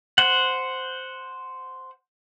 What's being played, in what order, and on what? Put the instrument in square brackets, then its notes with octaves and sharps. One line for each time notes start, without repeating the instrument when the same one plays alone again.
[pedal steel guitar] C5 F#5